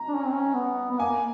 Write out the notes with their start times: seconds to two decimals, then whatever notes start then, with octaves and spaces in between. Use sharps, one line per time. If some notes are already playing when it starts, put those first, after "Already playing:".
Already playing: A#5
0.08 D4
0.16 C#4
0.24 C4
0.32 C#4
0.54 B3
0.91 B3
1.00 A#3 G#5